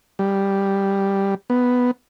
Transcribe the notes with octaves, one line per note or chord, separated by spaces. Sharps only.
G3
B3